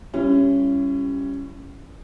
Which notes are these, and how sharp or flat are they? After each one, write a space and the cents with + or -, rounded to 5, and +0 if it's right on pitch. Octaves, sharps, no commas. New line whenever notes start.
G3 +0 C#4 +0 E4 +40